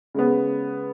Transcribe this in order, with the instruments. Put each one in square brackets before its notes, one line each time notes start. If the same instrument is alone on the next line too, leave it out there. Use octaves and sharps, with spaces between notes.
[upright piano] C#3 G#3 B3